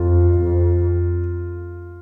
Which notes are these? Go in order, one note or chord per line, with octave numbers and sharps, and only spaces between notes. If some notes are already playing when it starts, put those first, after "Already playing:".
Already playing: F2 F4
F2